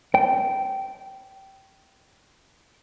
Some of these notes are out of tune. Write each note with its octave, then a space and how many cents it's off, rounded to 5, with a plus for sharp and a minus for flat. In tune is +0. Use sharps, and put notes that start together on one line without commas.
G5 -15